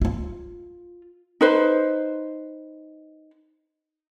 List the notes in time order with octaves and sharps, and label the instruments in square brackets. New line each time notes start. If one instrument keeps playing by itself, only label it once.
[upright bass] E4 F4
[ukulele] D#4 B4 C5